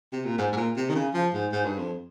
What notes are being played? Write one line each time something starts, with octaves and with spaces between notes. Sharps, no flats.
C3
A#2
G#2
G#2
A#2
C3
D#3
C#3
F3
G#2
G#2
G2
F2